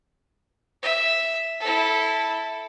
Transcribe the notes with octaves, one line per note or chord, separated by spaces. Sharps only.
E5
E4 A4